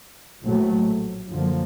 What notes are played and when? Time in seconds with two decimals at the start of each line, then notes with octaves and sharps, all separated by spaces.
0.43 A#1 A2 F#3 A3
1.30 F#2 D3 F3 A#3